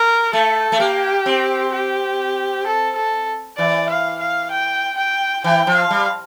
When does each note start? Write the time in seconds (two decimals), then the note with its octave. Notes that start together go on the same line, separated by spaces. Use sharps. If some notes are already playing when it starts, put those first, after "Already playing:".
Already playing: A#4
0.33 A3 A4
0.72 A3
0.80 A#3 G4
1.26 C4
1.73 G4
2.66 A4
2.96 A4
3.58 E3 D5
3.90 F5
4.19 F5
4.51 G5
4.97 G5
5.44 E3 G5
5.67 F3
5.75 F5
5.91 G3